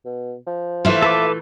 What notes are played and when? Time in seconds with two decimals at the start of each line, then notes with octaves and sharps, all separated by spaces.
0.05 B2
0.47 F3
0.85 A#2 E3 A3 F4 E5
1.02 A4 B4 D6